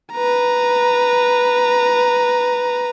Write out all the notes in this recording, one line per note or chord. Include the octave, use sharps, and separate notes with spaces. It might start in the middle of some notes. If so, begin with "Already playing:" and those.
B4 A#5